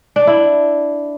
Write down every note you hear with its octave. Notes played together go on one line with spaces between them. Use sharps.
D4
E4